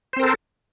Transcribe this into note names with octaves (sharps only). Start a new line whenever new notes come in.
C4 A4 A#4 C5